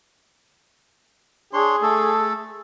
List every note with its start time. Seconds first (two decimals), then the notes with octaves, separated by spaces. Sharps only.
1.53 D4 G#4 C#5 C6
1.82 A3 A4